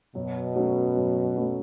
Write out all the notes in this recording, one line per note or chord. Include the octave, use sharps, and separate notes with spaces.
F#2 B2
F#3 A3 C#4
F#2
F#3 A3 C#4